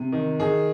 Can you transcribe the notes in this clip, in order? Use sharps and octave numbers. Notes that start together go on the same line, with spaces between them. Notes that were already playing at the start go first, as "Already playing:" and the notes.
Already playing: C3
D#3
D#3 G#4